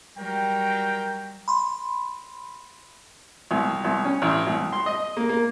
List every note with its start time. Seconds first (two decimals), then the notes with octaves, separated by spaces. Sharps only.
0.18 F#3 G3 A#4 G5
1.48 B5 C6
3.51 C2
3.84 C2
4.05 C#4
4.22 A1
4.47 C2
4.73 C6
4.86 D#5
5.17 A#3
5.29 A#3